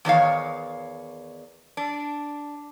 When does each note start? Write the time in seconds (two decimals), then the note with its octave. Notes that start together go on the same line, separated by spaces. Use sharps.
0.05 E2 D#3 C#5 F5
1.77 D4